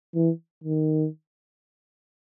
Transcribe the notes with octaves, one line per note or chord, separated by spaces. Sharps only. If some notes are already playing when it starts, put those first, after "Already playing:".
E3
D#3